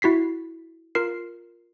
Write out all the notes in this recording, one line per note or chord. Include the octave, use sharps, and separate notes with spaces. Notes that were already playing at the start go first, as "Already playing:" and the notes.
E4 F#4 B6 C7
F4 A#4 C7